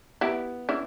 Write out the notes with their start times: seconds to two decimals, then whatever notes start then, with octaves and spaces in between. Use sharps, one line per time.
0.21 B3 E4 G4
0.69 C#4 D4 E4